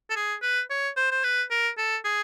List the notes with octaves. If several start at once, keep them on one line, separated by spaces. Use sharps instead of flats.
A4
G#4
B4
C#5
C5
C5
B4
A#4
A4
G#4